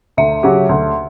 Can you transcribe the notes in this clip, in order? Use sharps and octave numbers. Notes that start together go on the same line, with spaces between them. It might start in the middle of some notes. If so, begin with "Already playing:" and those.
D2 E5
C#3 F#3 C#4 G4
D2